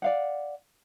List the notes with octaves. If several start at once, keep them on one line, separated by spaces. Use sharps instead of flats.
D5 F5 F#5